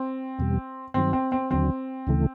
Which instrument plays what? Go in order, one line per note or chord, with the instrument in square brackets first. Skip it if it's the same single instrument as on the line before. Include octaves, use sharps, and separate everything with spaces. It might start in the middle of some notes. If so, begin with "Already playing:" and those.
Already playing: [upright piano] C4
[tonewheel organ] E2 B2 G3
[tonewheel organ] G2 D#3 F#3 [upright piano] C4
[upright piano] C4
C4
[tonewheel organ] D#2 D3 F#3 [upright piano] C4
[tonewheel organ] D2 C#3 E3 A3